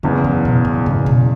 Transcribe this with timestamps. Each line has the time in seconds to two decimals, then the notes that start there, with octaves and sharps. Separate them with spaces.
0.03 F#1 E2 C#3 G#3
0.24 F#3
0.45 B2
0.65 A2
0.86 F#1 E2 G#2 C#3
1.06 B2